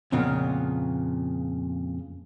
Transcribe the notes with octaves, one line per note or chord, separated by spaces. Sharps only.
F2 A#2 C#3 B3